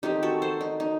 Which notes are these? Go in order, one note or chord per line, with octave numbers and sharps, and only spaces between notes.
D#3 A3 C4 D#4 G4
F#4 A4
A4 C5
D#4
D#4